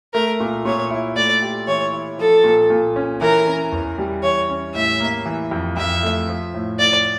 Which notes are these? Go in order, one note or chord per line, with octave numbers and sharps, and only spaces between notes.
A3 A#4
A#2
A#2 C#5
E4
A3 D5
G4
E3 C#5
E4
F3 A4
A#2
A#2
C#4
E3 A#4
C#4
E2
G3
E3 C#5
C#4
A2 E5
A#3
E3
F2
F2 E5
A3
F3
A2
A2 D5